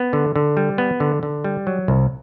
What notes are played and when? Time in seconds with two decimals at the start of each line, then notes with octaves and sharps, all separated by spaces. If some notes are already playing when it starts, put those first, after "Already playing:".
Already playing: B3
0.13 D3
0.36 D3
0.57 G3
0.78 B3
1.00 D3
1.23 D3
1.44 G3
1.67 F#3
1.88 C2